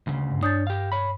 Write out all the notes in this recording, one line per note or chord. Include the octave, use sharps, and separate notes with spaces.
D2 C#3
G2
D4 C#5 D#6 G6 A6
G4 F5
C#5 B5